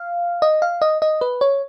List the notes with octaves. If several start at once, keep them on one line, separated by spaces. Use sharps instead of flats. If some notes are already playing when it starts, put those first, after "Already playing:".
Already playing: F5
D#5
F5
D#5
D#5
B4
C#5